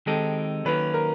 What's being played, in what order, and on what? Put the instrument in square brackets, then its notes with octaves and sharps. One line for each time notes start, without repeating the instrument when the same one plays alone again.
[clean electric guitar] D#3 G#3 C4 D#4 G4 [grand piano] A4
[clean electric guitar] D#3 F#3 A#3 C#4 [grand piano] B4
[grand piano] A#4